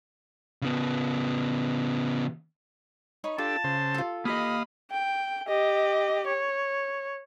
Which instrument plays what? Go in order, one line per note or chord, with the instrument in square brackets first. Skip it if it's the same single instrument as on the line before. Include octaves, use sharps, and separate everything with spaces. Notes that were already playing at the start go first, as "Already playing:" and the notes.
[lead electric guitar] C#3 B3
[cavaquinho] D#4 C#5 B5
[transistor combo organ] D4 G4 A4 [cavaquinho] F4 [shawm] A5
[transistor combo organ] C#3 C5
[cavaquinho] F4 A4
[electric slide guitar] A#3 G4 D#5 [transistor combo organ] F5 D#6 [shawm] B5
[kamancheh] G5
G4 D#5
C#5